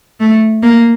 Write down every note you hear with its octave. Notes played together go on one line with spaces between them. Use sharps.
A3
A#3